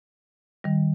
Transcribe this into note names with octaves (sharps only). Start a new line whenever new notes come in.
D#3 G3